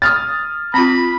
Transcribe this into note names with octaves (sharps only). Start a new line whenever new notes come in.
D#6 F6 A6
C4 F4 B5